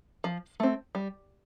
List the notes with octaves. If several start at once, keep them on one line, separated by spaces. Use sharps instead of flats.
F3
A3 C4
G3